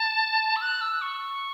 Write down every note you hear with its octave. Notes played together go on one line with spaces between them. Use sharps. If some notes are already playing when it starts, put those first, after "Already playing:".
Already playing: A5
E6
F#6
E6
C#6